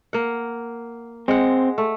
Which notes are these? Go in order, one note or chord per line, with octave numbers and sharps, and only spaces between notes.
A#3 F#5
G#3 C4 F#5
A3